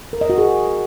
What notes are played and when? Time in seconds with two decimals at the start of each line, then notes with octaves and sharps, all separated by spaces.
0.13 A#4
0.21 D#5
0.30 F#4
0.38 G#4